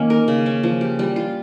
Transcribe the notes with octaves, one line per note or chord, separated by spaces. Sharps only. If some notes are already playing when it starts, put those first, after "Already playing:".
Already playing: D#3 A#3 C#4
A#4
C#3
C#4
F3
G4
G3
F4